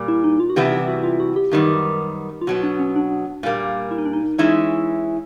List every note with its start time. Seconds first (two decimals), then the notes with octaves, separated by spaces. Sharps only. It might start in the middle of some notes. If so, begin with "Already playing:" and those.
Already playing: A#2 G3 A#3
0.08 E4
0.24 D#4
0.40 F4
0.50 F#4
0.56 C3 E3 G3 B3 E4 G4
0.72 G4
0.88 F#4
1.04 F4
1.20 F#4
1.36 G4
1.51 F#2 D#3 G3 B3
2.42 F4
2.47 B2 F#3 B3 F#4
2.63 D4
2.79 C#4
2.96 D4
3.43 A#2 G3 A#3
3.91 E4
3.98 D#4
4.06 D4
4.13 D#4
4.38 E3 G#3 C#4 D#4 E4